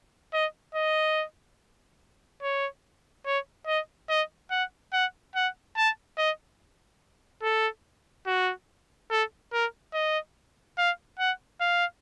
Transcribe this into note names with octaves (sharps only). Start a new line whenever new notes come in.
D#5
D#5
C#5
C#5
D#5
D#5
F#5
F#5
F#5
A5
D#5
A4
F#4
A4
A#4
D#5
F5
F#5
F5